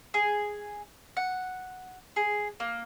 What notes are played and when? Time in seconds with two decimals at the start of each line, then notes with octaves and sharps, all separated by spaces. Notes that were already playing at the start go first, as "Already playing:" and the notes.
0.14 G#4
1.17 F#5
2.16 G#4
2.60 A#3